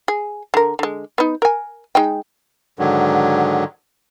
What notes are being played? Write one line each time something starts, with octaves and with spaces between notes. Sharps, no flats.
G#4
D3 A#4
D3 G#3
B3 D#4
A#4 G#5
G#3 D#4 G5
G#2 D3 D#3 F#3